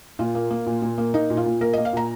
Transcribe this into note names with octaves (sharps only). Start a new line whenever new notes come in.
A#2 F4
A#3
A#3
A#2
A#2
A#3
A#3 D#4
A#2
F4
A#2
A#3 A#4
A#3 D#5
F5
A#2 A#5